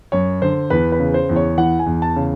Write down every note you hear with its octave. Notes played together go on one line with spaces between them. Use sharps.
F#2 C#5
D3 C5
E2 B4
B4
C#3
C5
E2
C#5
E3 F#5
G#5
E2
A5
C#3